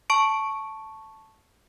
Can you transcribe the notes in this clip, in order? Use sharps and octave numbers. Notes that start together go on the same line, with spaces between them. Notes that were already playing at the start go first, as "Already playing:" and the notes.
A5 C#6 D7